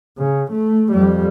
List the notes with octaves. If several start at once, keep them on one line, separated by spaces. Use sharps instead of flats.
C#3
A3
F2 G3